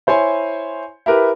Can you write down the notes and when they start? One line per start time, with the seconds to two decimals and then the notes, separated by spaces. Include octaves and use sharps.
0.07 E4 C5 C#5 G#5
1.06 E4 G4 A#4 B4